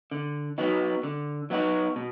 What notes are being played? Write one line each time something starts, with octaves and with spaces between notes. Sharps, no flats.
D3
F#3 B3 D#4 F#4
D3
F#3 B3 D#4 F#4
B2